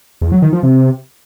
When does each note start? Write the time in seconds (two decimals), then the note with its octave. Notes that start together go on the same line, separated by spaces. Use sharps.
0.21 E2
0.32 F#3
0.42 D#3
0.53 F3
0.63 C3